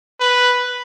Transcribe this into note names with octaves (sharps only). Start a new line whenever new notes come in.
B4